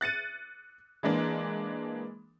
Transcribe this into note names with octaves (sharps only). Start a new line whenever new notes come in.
F#6 A6 C#7 D#7
E3 G#3 A#3 D4